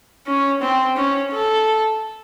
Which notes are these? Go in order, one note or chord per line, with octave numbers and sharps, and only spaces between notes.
C#4
C4
C#4
A4